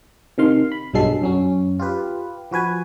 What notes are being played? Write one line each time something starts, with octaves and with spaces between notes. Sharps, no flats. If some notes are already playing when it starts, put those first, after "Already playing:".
C3 D#3 F5 C6
B5
B1 G2 F#3 G#3 A4 C7
F#2 F#3 C#4
F4 G4 B4
F3 F#4 B4 G#5